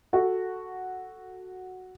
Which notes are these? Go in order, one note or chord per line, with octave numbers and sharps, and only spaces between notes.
F#4 A4